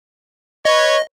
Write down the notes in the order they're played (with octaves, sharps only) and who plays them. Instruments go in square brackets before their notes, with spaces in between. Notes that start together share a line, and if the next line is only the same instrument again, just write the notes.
[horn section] B4 C#5 [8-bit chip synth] D#5